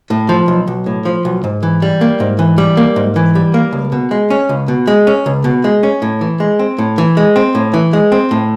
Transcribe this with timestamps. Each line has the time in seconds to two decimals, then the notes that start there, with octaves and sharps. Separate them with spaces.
0.10 A2
0.29 F3
0.48 B1
0.67 B1
0.86 A2
1.05 F3
1.25 B1
1.44 G#2
1.63 E3
1.82 G3
2.01 A#3
2.20 G#2
2.39 E3
2.58 G3
2.77 A#3
2.96 G#2
3.16 E3
3.35 G3
3.54 A#3
3.73 C#2
3.92 B2
4.11 G#3
4.30 C#4
4.49 C#2
4.68 B2
4.87 G#3
5.07 C#4
5.26 C#2
5.44 B2
5.64 G#3
5.83 C#4
6.02 A2
6.21 E3
6.40 G#3
6.59 C4
6.78 A2
6.98 E3
7.17 G#3
7.36 C4
7.55 A2
7.74 E3
7.93 G#3
8.12 C4
8.31 A2